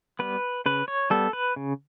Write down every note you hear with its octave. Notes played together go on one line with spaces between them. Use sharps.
G3 B3 B4
C#3 B4
C#5
G3 B3 A4
B4
C#3